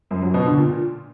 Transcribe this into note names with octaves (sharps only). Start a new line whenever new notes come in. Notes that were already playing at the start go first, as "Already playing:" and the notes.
F#2
F#3
B2
D3
A#2